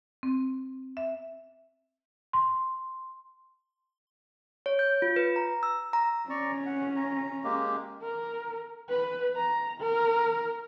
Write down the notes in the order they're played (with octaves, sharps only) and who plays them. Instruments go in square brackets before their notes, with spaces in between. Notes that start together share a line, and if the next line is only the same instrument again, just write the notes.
[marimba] C4
E5
[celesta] C6
[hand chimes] C#5
G6
F4
B4
A#5
E6
A#5
[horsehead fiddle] C#4 [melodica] D5 A#5 C#6
[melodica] F#5
A#5
G#3 A#3 G4
[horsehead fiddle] A#4
B4
A#5
A#4